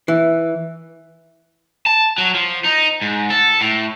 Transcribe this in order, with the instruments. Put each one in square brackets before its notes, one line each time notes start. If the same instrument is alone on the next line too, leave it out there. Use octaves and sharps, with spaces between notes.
[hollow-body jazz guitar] E3
[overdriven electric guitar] A5
F#3
F3
D#4
G#2
A4
A2